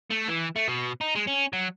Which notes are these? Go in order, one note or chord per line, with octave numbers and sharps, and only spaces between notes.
A3
E3
A3
B2
D#4
G#3
C#4
F#3